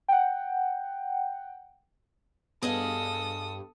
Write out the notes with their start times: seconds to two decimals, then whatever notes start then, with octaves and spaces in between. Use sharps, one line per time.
0.08 F#5 G5
2.63 G2 B3 G#4 A4 D#5 F5 D#6